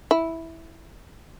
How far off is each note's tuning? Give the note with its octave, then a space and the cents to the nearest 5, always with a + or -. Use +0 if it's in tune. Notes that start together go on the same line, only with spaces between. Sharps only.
E4 -5